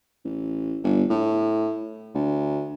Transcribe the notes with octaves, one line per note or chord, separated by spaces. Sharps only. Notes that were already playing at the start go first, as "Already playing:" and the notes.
A1
G1
A2
D2